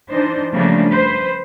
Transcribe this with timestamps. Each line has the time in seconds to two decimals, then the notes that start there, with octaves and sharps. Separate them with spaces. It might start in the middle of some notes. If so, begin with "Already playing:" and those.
0.11 E3 D4 D#4 C5
0.54 C#3 F3 G3 A3 A#3 D4
0.90 B4 C5